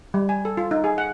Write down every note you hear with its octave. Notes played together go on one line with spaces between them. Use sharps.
G3
G#5
A4
F4
D#4
G#4
F#5